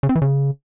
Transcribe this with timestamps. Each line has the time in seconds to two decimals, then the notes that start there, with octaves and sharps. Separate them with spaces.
0.03 C#3
0.09 C4
0.15 E3
0.22 C#3